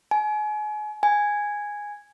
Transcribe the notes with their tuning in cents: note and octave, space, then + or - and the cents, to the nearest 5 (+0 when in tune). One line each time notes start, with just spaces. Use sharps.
G#5 +35
G#5 -5